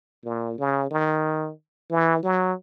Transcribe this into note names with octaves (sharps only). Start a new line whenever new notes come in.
A#2
C#3
D#3
E3
F#3